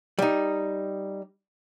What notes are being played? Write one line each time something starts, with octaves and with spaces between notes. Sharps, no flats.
G3 D#4